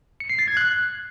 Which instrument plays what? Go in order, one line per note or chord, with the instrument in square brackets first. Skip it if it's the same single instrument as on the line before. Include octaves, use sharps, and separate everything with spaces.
[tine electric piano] C#7
C7
A6
G#6
F#6